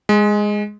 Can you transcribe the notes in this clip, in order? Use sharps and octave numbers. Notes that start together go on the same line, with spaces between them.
G#3